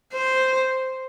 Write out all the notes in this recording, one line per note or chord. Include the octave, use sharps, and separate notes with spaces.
C5